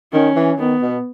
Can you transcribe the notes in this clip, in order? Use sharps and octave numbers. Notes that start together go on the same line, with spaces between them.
D#3 C#4
E3
D#3 B3
B2